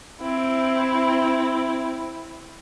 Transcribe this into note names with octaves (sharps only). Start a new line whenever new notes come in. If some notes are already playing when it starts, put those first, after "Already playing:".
C4 E4